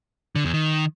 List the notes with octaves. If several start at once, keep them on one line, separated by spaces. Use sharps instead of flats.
D3
E2
D#3